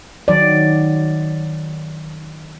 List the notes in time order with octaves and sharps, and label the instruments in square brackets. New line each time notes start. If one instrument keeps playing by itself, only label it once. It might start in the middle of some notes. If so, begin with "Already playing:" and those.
[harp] D#3 [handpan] F#3 D5